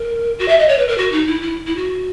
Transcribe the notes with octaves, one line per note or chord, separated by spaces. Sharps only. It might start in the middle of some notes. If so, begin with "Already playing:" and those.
Already playing: A#4
F#4
E5
D#5
C#5
B4
A#4
F#4
D#4
E4
E4
E4
F#4